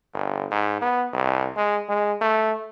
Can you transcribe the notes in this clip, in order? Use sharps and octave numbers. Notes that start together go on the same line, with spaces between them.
G1
G#2
B3
C2
G#3
G#3
A3